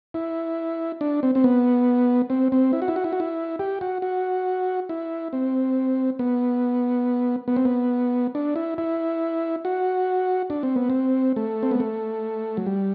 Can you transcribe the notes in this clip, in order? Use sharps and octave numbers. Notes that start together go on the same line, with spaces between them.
E4
D4
C4
C4
B3
C4
C4
E4
F#4
E4
F#4
E4
F#4
E4
G4
F#4
F#4
E4
C4
B3
B3
C4
B3
D4
E4
E4
F#4
D4
C4
B3
C4
A3
C4
B3
A3
F#3
G3